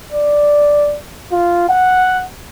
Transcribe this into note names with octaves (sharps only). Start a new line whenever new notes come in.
D5
F4
F#5